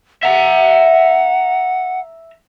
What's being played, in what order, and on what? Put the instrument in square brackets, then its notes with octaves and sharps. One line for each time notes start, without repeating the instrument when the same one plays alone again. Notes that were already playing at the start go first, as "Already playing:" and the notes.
[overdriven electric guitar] E5 A#5 [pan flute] F#5